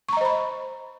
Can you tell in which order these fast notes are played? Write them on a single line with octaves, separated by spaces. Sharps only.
C#6 A#5 D#5 C5 B5